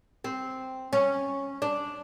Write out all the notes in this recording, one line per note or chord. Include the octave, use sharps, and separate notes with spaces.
C4
C#4
D4